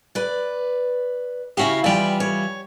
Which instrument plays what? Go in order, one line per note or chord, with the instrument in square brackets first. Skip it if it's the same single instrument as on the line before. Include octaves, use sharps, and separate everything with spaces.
[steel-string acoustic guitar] B4 D5
[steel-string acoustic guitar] C#3 E4 F5 [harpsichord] C#4 F#4 G4
[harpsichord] E3 G3 F4 [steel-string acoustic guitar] D5 G5
[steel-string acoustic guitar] C#5